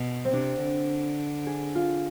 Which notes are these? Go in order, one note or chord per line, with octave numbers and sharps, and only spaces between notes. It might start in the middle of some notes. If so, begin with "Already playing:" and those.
Already playing: B2
C4
C3 D4
D3
G#4
F4